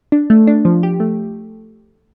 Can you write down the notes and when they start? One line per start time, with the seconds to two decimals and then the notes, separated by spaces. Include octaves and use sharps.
0.12 D4
0.30 A3
0.47 D4
0.65 F3
0.83 G4
1.00 A3